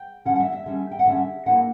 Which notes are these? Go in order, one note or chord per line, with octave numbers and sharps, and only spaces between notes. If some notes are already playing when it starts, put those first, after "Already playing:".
Already playing: G5
D3 G3 C#4 F#5
F#5
E5
E5
D3 G3 C#4 E5
G5
F#5
D3 G3 C#4 E5
D3 A#3 E4 F#5